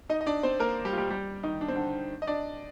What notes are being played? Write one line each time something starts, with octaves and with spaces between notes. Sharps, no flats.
D#4 D#5
D#5
D4 D5
C4 C5
A#3 A#4
G3 G4
F4
G3 G4
G3 G4
D#3 D#4
D4
C4
D3 D4
D#5
D4 D5